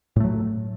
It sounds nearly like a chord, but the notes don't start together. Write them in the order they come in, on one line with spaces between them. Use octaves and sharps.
A2 A3 F#3